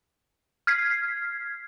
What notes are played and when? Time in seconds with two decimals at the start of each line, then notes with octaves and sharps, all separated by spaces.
0.67 F6 G#6 B6 C7